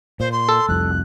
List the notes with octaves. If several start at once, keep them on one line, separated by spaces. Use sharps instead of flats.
A#2 C5
C6
A4
F1 C2 F2 F#6